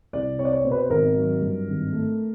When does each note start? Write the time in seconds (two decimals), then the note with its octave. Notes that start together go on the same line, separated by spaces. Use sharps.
0.13 C2 D5
0.39 C4 C#5
0.45 D5
0.53 C#5
0.64 B2 C5
0.71 B4
0.78 C5
0.90 G#1 A#4
1.16 F#3
1.41 G2
1.68 G#1
1.93 A3